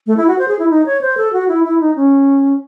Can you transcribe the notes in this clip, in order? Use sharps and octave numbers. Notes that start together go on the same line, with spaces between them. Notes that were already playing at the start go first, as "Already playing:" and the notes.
A3
E4
F#4
C5
G#4
E4
D#4
C#5
C5
A4
F#4
E4
E4
D#4
C#4